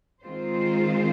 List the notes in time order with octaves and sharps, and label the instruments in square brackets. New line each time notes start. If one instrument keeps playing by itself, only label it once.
[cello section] D#3 G#3 C4 F4 C5